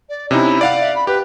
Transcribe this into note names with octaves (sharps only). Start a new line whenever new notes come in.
D5
C3 C#4 D#4 E4
D5 F5 F#5
E5
B5
G4 B4